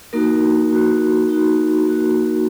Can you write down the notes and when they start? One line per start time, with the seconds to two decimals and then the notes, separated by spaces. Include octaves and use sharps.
0.13 A#3 D#4 F#4 A#4
0.70 A#3 D#4 F#4
1.26 A#3 D#4 F#4
1.83 A#3 D#4 F#4 A#4